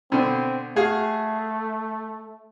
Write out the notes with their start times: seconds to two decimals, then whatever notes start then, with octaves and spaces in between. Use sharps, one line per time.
0.12 B2 D3 C4
0.76 A3 F#4 G#4 F5